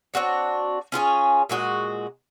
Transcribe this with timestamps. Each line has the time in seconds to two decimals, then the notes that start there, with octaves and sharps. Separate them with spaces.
0.14 C4 D4 F#4 C#5
0.92 C#4 F4 G#4 C#5
1.49 A#2 G#3 F#4 D#5